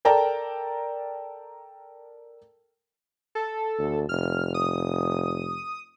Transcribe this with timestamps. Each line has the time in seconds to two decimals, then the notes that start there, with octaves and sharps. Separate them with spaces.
0.05 A4 A#4 D5 G5 A5 A#5
3.35 A4
3.78 D2
4.09 F1 F6
4.54 D#6